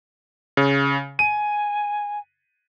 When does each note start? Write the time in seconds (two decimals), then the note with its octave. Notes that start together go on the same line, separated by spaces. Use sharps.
0.57 C#3
1.19 G#5 D#7